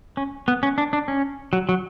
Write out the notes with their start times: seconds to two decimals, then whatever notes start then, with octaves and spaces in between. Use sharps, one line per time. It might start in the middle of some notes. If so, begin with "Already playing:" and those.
0.17 C#4
0.48 B3
0.63 C#4
0.78 D4
0.93 D4
1.08 C#4
1.53 F#3
1.69 F#3